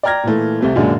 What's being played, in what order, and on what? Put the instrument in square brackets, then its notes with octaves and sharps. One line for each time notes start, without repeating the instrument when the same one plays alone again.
[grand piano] D5 G5 A#5 F6 G#6 A#6
A#2 E3 A3
C2 C3 A3
F#2 A#2 D3 G#3 D4